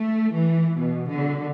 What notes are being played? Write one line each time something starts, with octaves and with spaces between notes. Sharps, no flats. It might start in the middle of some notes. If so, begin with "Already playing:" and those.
Already playing: A3
E3
B2
D3